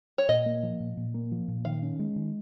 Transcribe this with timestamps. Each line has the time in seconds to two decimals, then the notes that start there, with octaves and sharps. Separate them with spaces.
0.18 C#5
0.29 A#2 D#5
0.46 A#3
0.63 F3
0.80 A#2
0.97 A#2
1.14 A#3
1.32 F3
1.48 A#2
1.65 D#3 F5
1.82 C#4
1.99 G#3
2.16 D#3